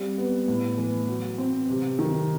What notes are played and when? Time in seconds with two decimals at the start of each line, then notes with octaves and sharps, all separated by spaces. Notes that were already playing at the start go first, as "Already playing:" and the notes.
Already playing: G3 C4
0.18 B3
0.48 A2
0.78 E3
1.08 F#3
1.38 C4
1.69 C3
1.99 D#3